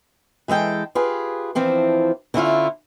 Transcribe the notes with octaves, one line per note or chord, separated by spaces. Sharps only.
E3 G#3 A4 G5
F4 G4 G#4 B4
E3 F3 C4 D4
D3 C#4 E4 F4